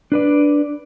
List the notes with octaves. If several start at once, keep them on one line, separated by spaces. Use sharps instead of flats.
D4 B4 D5